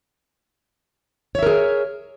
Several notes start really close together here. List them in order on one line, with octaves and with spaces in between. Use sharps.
C#5 E5 A#4 G#4